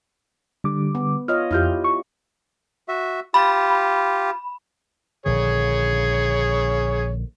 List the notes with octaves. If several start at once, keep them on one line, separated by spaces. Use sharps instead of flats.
D3 G3 D6
B3
F4 C#5 D#5 F6
F2 E4 F4 G4 F6 G6
C#6
F#4 E5
F4 G4 B5
A#1 D3 D#3 G#4 C#5